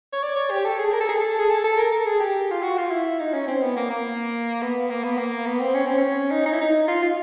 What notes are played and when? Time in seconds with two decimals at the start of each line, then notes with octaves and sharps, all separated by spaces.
0.13 C#5
0.22 D5
0.36 C#5
0.51 G4
0.65 A4
0.79 G#4
0.93 A#4
1.00 A4
1.09 G#4
1.17 A4
1.39 G#4
1.50 A4
1.64 A4
1.77 A#4
1.92 A4
2.06 G#4
2.20 G4
2.51 F4
2.63 F#4
2.77 F4
2.91 E4
3.20 D#4
3.34 C#4
3.48 C4
3.63 B3
3.76 A#3
3.90 A#3
4.62 B3
4.90 A#3
5.04 B3
5.18 A#3
5.46 B3
5.60 C4
5.75 C#4
5.86 C4
5.97 C#4
6.31 D#4
6.46 D#4
6.53 E4
6.61 D#4
6.88 F4
7.02 F4